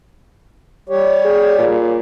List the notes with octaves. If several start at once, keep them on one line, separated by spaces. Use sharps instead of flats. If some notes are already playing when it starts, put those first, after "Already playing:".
G3 G4 C#5
G#4
A#2